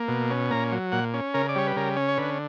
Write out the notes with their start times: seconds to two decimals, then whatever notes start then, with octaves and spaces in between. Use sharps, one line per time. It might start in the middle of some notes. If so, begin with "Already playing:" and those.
Already playing: A#3
0.08 B2
0.30 C#4
0.50 A#2 A#5
0.72 F#3
0.92 A#2 F#5
1.14 C#4
1.34 C#3 A#4
1.49 D5
1.55 G3 C#5
1.67 B4
1.76 C#3 A#4
1.97 C#4
2.08 C#5
2.18 D3 B4